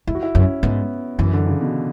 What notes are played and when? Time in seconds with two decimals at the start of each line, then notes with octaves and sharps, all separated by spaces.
0.07 E2 E4
0.15 F#4
0.23 E4
0.35 F#2 C#4
0.63 G#2 B3
1.19 F#2 E3
1.33 D3
1.47 C#3
1.61 B2